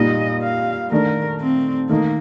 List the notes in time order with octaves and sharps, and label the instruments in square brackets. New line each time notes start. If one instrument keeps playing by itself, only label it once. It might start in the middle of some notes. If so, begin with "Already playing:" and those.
Already playing: [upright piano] A#2 G3 A#3 D#4 [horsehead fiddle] D#5
[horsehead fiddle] F5
[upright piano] D#3 A3 D4 [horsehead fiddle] A#4
[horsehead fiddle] C4
[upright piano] D#3 A3 D#4 [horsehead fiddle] A#3